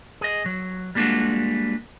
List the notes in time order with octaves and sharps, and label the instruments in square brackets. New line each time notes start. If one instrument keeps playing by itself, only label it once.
[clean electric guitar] G#4 D#5
F#3
G3 G#3 A#3 D4 F4 F#4